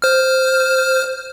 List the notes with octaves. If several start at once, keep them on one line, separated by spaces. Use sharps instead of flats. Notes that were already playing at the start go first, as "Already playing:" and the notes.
C5 F6